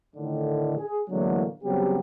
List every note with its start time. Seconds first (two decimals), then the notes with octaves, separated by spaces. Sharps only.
0.16 A2 D3 D#3
0.78 G#4
1.10 A2 D3 E3 F#3 G#3 A#3
1.64 C#3 F#3 G3 B3 C4 G4